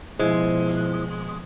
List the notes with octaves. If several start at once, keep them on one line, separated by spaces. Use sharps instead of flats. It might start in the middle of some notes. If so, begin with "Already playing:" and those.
B2 F3 G#3 E4 C5